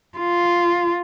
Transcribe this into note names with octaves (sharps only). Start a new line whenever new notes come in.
F4